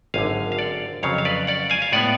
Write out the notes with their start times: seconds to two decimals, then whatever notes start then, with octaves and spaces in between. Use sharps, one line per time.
0.14 G#1 F#2 D3 F5 G#5
0.52 F5
0.59 D5 F#5
1.03 F2 C#3 F#3 C#5 F5
1.18 F5
1.25 B4 D5
1.47 D5 F#5
1.70 F5 G#5
1.82 F5
1.92 A2 G#3 B3 D5 F#5